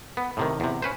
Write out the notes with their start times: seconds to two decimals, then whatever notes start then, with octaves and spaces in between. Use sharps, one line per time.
0.17 B3
0.37 A2 C3 D#3
0.60 E2 C3
0.82 C#4 B4 C5